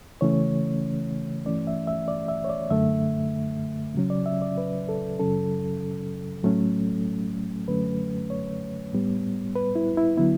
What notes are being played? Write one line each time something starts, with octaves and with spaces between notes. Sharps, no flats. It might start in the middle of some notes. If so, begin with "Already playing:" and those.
C#3 E3 A3 C#4 C#5
G2 E3 A3 C#4 D5
E5
E5
D5
E5
C#5
D5
F#2 D3 A3 E5
C#3 F#3 C#4
D5
E5
D5
B4
A4
F#2 C#3 F#3 C#4 A4
A2 F#3 A3 C#4
F#2 D3 F#3 A3 C#4 B4
C#5
A2 G3 B3
B4
E4
E4
D3 F#3 B3 E4